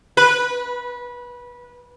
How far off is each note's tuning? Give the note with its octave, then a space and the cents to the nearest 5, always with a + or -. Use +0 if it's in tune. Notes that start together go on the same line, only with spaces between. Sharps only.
B4 -20